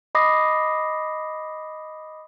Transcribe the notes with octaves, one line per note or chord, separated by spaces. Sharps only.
D#5 B5 D6 D#6 A#6 C7